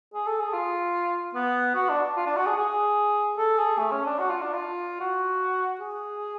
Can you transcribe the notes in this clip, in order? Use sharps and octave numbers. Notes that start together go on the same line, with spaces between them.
G#4
A4
G#4
F4
B3
F#4
D4
F4
D4
F#4
G#4
G#4
A4
G#4
A3
C#4
D4
F#4
F4
D4
F4
F#4
G#4